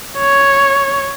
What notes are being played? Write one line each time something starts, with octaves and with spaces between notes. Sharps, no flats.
C#5